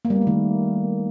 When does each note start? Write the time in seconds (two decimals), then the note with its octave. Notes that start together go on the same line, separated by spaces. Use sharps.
0.05 A#3
0.10 G3
0.16 B3
0.21 A3
0.27 D#3